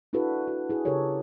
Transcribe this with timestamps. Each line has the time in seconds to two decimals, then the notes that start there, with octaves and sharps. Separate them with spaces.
0.13 D4 E4 F#4 A4 B4
0.48 F#4
0.70 E4 G#4
0.85 C#3 G4 A4 A#4 C#5